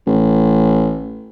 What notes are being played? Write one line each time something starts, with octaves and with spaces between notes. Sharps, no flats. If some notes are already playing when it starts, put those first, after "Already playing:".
A1